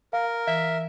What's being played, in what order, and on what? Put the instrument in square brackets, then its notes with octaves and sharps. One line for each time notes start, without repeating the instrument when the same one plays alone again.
[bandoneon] A#4 [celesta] F5
[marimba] E3 [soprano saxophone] E5